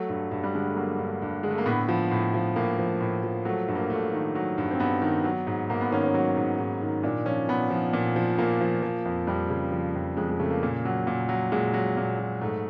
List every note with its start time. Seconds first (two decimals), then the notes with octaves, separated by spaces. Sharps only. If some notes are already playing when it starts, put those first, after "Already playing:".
Already playing: F#3 A3
0.09 G2
0.31 G2
0.44 G3
0.54 D3 G#3
0.66 A3
0.76 F#3 A#3
0.99 G2
1.22 G2
1.43 D3 G#3
1.51 A3
1.58 A#3
1.66 A2 B3
1.89 F3
2.11 A2
2.34 F3
2.56 A2 A#3
2.78 F3
3.00 A2
3.23 F3
3.45 F#3 A3
3.68 G2
3.75 A#3
3.90 G2 A3
4.12 D#3
4.35 F#3
4.58 G2
4.71 C4
4.80 G2 B3
5.02 D#3
5.24 F#3
5.47 G#2
5.70 G#2 A#3
5.81 B3
5.92 D#3 C#4
6.04 C#4
6.14 F#3
6.37 G#2
6.59 G#2
6.82 D#3
7.03 A#2 D4
7.26 F3 C#4
7.48 A#2 B3
7.70 F3
7.93 A#2
8.16 F3
8.38 A#2 A#3
8.61 F3
8.83 F3
9.05 F2
9.27 F2 G3
9.50 C#3
9.72 F3
9.95 F2
10.17 F2 G#3
10.29 G#3
10.40 C#3 A3
10.51 A#3
10.63 A#2
10.85 F#3
11.07 A#2
11.29 F#3
11.52 A#2 G#3
11.74 F#3
11.97 A#2
12.19 F#3
12.41 G#2 A3